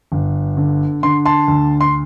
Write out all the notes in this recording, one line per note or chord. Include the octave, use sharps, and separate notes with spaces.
G1
D3
D3 C6
A5 C6
D2
C6